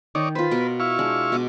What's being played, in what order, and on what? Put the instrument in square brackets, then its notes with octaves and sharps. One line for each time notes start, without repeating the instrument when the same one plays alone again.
[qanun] D#3 [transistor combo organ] D#4 C#5 D5
[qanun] F4 C5 [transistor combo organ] B4
[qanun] B2 A#4
[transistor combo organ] E4 F5 C#6
[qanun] G#3 D4
B2 D#5 D6